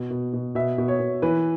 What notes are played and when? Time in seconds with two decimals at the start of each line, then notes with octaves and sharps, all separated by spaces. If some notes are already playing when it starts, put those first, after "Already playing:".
Already playing: B2
0.11 B2
0.33 B2
0.55 B2 E5
0.78 B2
0.88 C#5
1.00 B2
1.22 E3 B4